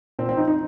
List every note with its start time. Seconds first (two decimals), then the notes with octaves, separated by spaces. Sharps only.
0.19 A#2 C4
0.29 C4
0.37 F3 D#4
0.48 D#4